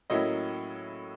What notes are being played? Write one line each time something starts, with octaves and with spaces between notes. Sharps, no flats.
A2 F#3 A#3 C#4 E4 D#5